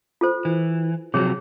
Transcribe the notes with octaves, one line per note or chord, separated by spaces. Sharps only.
F4 A4 C5
E3
C3 F3 F#3 G#4 C#5